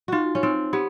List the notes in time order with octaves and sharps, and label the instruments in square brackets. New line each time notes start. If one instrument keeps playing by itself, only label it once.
[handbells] D#4 [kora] F4 F#4
[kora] C#4
[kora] C4 [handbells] D#4
[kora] B3 [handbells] G4